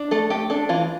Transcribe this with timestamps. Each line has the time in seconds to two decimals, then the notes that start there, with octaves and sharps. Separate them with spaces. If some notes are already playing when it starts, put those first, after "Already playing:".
Already playing: D4
0.11 A3 A4
0.30 A3 G4
0.50 D4 A4
0.69 E3 F4